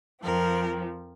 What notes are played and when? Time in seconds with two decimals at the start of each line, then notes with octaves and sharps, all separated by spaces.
0.23 F2 F3 C4 A#4